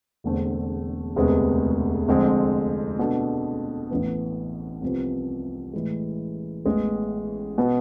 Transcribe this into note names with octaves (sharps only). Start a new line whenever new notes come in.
E1 E2 D3 A3 C4
E1 D2 C3 G#3 B3
F1 F2 D3 G#3 C4
B2 B3 D4 A4
A1 A2 E3 B3
C2 C3 F3 B3
A2 E3 G#3
A1 A2 G#3 B3
B2 B3